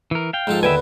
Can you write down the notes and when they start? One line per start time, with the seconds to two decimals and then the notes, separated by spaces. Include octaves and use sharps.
0.11 E3 A#4
0.33 F5 G5
0.47 G#2 F3 A4
0.63 D#2 D3 B4 E5 G5 G#5